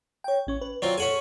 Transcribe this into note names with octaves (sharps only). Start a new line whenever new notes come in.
C#5 G5
A1 C#4 C#6
B4
F#3 C4 F4 D5
C#4 G#4 A4 F#5 G#5